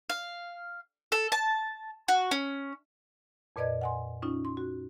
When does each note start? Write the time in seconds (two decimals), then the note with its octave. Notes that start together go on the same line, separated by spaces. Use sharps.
0.10 F5
1.12 A4
1.32 A5
2.08 F#4
2.31 C#4
3.56 F2 A#2 B4 D5 D#5 G#6
3.81 F#5 G#5 C6
4.22 C#4 D#4 F4
4.45 C6
4.57 F#4